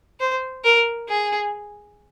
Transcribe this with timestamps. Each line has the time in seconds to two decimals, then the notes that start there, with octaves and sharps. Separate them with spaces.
0.20 C5
0.64 A#4
1.08 G#4